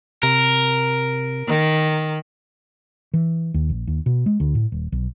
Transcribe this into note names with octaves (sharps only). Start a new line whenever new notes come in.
C3 A#4
D#3
E3
D#2
A#1
D#2
B2
G#3
D2
A2
D#1
B1